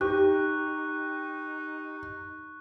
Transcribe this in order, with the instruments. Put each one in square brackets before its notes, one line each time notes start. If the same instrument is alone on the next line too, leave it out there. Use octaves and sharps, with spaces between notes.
[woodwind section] D#4 [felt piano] G4 [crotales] C#6 F#6